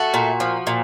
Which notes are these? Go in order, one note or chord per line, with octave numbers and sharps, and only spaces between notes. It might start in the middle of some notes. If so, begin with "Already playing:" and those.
Already playing: A3 F#4
A#2
F3
A#2